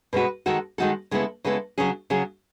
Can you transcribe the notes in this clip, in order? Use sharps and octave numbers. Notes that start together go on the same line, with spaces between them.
B2 G#3 C#4 F#4 B4
D#3 G#3 D#4 F#4 A4
D#3 G#3 D#4 F#4 A4
C#3 G#3 B3 E4 A4
C#3 G#3 B3 E4 A4
C#3 F#3 C#4 G#4
C#3 F#3 C#4 G#4